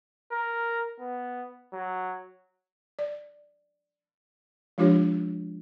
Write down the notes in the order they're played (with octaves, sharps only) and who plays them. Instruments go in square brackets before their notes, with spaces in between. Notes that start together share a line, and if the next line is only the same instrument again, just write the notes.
[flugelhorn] A#4
B3
F#3
[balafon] D5
F3 G#3 D4 F4 G4 C#5